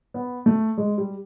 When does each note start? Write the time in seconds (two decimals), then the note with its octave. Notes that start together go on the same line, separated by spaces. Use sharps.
0.14 B3
0.46 A3
0.78 G#3
0.98 G3